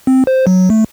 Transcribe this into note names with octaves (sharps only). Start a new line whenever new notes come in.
C4
C5
F#3
A3